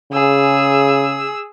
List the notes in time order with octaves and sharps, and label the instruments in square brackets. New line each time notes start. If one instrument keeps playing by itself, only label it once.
[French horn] C#3 [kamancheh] G#4 E6